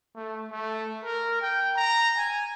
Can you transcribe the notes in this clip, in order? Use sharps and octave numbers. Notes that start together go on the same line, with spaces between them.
A3
A3
A#4
G5
A#5
G#5